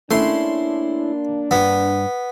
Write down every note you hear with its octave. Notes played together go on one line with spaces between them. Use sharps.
A3 A#3 C#4 D4 E4 C6
E2 G2 B3